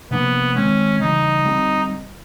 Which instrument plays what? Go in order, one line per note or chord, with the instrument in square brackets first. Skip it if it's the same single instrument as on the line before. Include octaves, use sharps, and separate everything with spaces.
[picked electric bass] C3 F3 A#3 D4 [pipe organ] B3
[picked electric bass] D#3 G#3 C4 [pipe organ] C#4
[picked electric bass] C#3 E3 G3 [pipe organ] D#4
[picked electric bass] D3 G3 C4